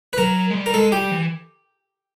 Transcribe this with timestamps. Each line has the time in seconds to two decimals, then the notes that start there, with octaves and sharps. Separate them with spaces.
0.13 B4
0.18 F#3 A#4
0.50 G#3
0.55 G3
0.66 A#4
0.74 G#3 A4
0.91 G3 G4
1.11 E3